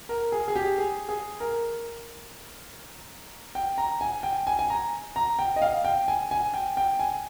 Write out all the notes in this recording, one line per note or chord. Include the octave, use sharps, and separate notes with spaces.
A#4
G#4
G#4
G4
G#4
G#4
A#4
G5
A#5
G#5
G5
G#5
G#5
A#5
A#5
G5
D#5
F5
G5
G#5
G#5
G5
G5
G#5